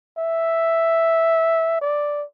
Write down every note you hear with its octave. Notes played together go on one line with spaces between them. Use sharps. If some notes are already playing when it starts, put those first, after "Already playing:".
E5
D5